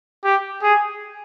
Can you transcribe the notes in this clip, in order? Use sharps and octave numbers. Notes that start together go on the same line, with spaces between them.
G4
G#4